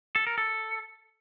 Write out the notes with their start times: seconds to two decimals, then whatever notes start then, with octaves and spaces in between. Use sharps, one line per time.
0.16 A4
0.27 A#4
0.38 A4